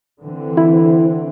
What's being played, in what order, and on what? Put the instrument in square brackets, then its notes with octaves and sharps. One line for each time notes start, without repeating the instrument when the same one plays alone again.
[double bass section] D3 E3 C4
[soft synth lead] E4